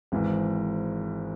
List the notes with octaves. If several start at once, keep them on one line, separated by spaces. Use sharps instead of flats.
G#1 G#2 E3